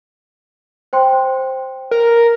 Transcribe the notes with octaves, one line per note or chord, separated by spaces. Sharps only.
C5 G5 C6
A#4